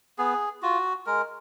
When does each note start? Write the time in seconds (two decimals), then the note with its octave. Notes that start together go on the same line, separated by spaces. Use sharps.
0.18 B3 G#4
0.63 F4 F#4
1.06 G#3 A#4